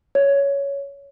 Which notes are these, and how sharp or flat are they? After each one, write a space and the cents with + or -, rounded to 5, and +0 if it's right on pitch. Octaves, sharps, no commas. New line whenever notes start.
C#5 +10